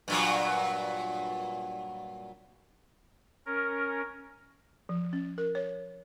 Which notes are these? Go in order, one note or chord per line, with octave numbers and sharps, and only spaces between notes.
G2 A#2 F#3
C#4 A#4
F3
C#4
A#4
C#5